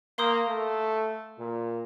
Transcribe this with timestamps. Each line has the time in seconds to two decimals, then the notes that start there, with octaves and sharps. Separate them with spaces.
0.18 A#3 F5 C6 D#6 G6
0.48 A3
1.39 A#2